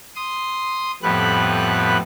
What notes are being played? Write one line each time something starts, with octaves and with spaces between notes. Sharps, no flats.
C6 D#6
F2 A2 G3 B3 B4 F#6